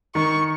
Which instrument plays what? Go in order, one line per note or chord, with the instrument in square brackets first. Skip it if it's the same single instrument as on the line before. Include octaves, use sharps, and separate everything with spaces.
[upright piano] D#3 [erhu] C#6